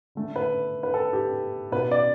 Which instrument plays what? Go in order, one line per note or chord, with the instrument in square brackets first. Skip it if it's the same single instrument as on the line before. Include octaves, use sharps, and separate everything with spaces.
[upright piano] D3 A3
B4
B4
A4
G4
B2 B4
B3
D5